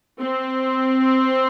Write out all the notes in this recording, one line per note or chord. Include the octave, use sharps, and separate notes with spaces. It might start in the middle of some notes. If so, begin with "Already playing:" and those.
C4